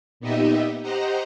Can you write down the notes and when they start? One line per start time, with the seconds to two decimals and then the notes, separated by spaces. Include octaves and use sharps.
0.20 A#2 B3 D#4 G4 D#5 E5
0.82 G4 C5 D#5 F#5 A#5